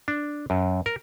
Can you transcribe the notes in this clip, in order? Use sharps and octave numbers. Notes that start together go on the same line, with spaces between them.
D4
F#2
A#4